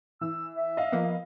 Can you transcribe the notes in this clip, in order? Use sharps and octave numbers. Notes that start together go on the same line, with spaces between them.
E3 E6
E5
D#5 F5
F3 A#3 B3